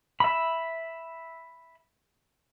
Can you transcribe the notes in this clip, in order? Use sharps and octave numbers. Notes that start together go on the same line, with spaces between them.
E5 B5